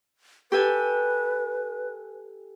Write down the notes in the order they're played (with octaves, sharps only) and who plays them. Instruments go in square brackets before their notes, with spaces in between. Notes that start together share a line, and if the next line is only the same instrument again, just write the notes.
[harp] G4 A4 G#5 [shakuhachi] B4